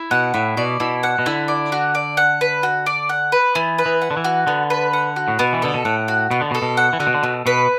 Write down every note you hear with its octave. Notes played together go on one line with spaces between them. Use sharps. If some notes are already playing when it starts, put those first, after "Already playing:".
Already playing: E4
B2 F#5
A2 E4
B2 D5
B2 E4
F#5
B2
D3 E4
D5
F#4
D5
F#5
B4
F#4
D5
F#5
B4
E3 B3
B4
E3
F#5
D3
E3
F#4
D3 B3
B4
F#5
F#4
A2
B2 B3
E3
D3 A4
B2
A2 F#5
F#4
B2 B3
D3
B2
A4
B2
F#5
E3
D3 F#4
B2
D3
B2 A3
B2 B4